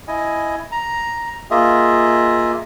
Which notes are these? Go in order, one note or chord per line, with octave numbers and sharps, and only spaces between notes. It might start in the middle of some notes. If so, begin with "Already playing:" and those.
E4 D#5 G#5
A#5
A#3 F4 G#4 D#5 E5